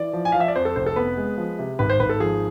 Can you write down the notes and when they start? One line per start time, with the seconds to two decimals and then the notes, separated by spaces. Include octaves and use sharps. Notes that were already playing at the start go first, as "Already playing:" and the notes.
Already playing: E3 D5
0.13 F3
0.25 G#5
0.32 F5
0.35 F3
0.40 E5
0.48 D5
0.56 F2 C5
0.65 A4
0.76 F1 C5
0.86 A4
0.96 B3 B4
1.17 G#3
1.37 F3
1.59 C3
1.79 G#1 B4
1.90 C5
2.00 G#1 B4
2.09 A4
2.20 F3 G#4